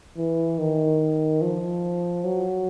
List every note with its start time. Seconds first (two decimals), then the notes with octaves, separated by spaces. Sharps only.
0.17 E3
0.59 D#3
1.42 F3
2.24 F#3